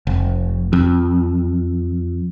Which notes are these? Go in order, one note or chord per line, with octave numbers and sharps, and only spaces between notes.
F1
F2